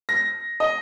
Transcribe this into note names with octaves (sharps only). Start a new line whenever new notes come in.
A#6
D#5